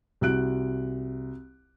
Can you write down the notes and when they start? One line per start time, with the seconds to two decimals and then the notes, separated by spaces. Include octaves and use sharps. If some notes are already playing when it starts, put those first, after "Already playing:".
0.21 C2 F#4 F#6 D7